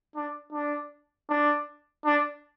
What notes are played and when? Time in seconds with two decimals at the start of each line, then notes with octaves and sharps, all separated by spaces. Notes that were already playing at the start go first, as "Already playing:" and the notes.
0.15 D4
0.53 D4
1.30 D4
2.06 D4